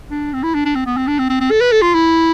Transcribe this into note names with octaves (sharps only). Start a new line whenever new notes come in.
D4
C4
E4
D4
D4
C4
B3
C4
D4
C4
C4
C4
A4
B4
A4
F4
E4